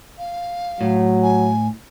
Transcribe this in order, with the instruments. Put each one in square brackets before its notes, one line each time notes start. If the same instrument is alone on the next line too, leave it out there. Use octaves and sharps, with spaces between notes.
[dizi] F5
[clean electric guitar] A2 [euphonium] F#3
[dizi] G#5